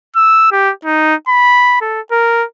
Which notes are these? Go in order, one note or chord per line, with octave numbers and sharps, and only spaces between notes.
E6
G4
D#4
B5
A4
A#4